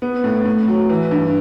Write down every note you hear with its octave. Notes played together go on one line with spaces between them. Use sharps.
B3
A2
A2
F#3
E3
G2